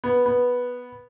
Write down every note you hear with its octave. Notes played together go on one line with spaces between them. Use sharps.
B3
B3